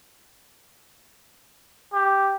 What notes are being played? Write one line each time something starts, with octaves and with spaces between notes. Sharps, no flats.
G4